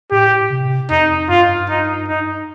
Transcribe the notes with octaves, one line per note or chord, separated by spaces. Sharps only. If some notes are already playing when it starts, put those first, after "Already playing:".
A2 G4
C3
F2 D#4
G2 F4
D#4
D#4